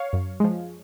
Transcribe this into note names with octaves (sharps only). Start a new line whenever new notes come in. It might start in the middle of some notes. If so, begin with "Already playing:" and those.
Already playing: C#5 F5
F#2
F3 G#3